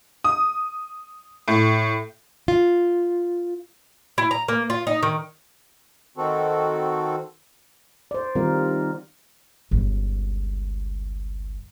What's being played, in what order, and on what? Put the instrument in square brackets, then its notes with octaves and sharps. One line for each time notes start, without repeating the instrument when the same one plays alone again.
[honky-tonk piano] D#6
A2
[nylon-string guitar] F4
[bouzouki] E4
A#5
A#3
F4
D#4
D#3
[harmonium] D#3 C4 F#4 A4
[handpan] C5 D5
D#3 G3 C4 F4 A#4
[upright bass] G1 C#2